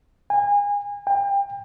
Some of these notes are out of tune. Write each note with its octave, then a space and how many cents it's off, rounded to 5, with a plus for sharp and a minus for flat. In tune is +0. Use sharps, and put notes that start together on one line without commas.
G#5 -30
G5 +30